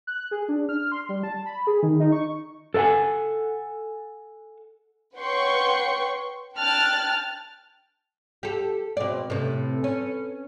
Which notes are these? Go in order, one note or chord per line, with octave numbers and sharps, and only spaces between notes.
F#6
G#4
D4
F6
C6
G3
A5
B5
G#4
D#3
D#4
C#6
A4 A#4 F5 F#5 G#5
B4 C#5 F#5 G5 C6 C#6
G5 A5 F6 F#6 A6
G4 A4
B2 F3 G#3 C4 D5
A2 C3 A4 B4
C#4